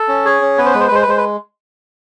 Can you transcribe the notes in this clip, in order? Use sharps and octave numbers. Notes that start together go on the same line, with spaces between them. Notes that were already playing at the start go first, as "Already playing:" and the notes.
Already playing: A4
C#4
G#4 C#5
C#4
B3 B4
C5
G#3 B4
C5
B4
G#3 C5
B4
G#3 C5
B4